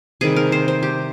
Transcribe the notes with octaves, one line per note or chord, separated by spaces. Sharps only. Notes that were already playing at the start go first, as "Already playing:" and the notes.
C3 D#3 G3 G#4
A#4
C5
C5
G4